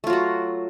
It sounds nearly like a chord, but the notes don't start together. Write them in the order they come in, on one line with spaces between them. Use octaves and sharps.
A3 F4 F#3 F#4